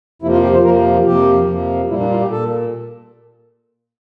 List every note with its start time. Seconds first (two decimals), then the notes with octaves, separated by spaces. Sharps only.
0.22 F2 C3 F3 A#3 E4
0.33 F4
0.43 G4
0.53 C5
0.64 F2 C3 F3 A#3 A#4
1.06 F2 C3 F3 A#3 G4
1.47 F2 C3 F3 A#3
1.90 A#2 G3 A#3 E4
2.00 D4
2.10 F4
2.21 G4
2.31 A#2 A4